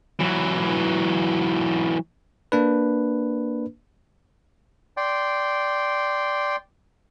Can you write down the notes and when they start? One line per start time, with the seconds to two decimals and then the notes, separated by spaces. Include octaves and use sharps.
0.19 E3 F#3
2.52 A#3 D4 B4
4.97 D5 G5 C6